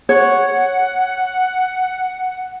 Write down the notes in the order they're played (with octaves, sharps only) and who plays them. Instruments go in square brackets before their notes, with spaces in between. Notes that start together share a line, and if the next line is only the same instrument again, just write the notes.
[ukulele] C#5 [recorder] F#5